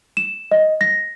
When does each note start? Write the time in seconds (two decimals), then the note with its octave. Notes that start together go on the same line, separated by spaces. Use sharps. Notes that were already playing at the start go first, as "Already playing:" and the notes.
0.17 E7
0.51 D#5
0.81 A#6